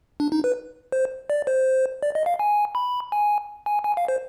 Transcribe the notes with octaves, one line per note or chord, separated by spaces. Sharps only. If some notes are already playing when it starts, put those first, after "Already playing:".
D4
D#4
B4
C5
D5
C5
D5
D#5
F5
G#5
B5
G#5
G#5
G#5
F5
C5